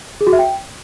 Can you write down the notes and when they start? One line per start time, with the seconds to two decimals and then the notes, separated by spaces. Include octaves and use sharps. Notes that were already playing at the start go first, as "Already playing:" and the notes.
0.21 G#4
0.27 F#4
0.33 E5
0.39 G5